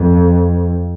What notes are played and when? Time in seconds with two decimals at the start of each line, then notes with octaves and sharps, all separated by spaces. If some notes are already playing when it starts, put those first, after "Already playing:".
Already playing: F2